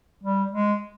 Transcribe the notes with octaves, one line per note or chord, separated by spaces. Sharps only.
G3
G#3